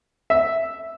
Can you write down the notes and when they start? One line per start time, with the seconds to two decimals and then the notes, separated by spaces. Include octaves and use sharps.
0.30 E5